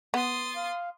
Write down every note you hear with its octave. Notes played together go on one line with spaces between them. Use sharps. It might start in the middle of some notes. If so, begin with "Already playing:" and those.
B3 C6 D#6 A6
F5